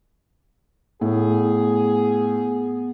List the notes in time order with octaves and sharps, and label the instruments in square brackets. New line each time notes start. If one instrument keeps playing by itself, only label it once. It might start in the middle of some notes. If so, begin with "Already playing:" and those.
[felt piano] A2 [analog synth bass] B3 [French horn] G#4